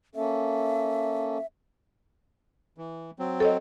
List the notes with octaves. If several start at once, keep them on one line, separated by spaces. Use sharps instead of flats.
A#3 C#4 A4 E5
E3
F#3 C4
A4 C#5 D#5